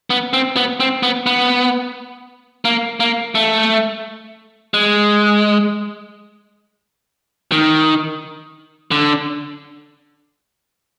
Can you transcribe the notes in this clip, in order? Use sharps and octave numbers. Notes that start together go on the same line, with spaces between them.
B3
C4
B3
C4
B3
B3
A#3
A#3
A3
G#3
D#3
D3